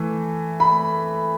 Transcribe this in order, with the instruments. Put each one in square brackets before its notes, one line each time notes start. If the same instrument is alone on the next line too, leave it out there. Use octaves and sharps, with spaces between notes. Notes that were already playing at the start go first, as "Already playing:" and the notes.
Already playing: [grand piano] E3 A3
B5